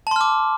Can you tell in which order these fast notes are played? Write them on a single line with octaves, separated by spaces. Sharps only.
A5 C6 F6 D6